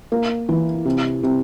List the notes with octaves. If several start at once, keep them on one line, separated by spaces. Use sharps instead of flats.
A#3
E3
C3
C3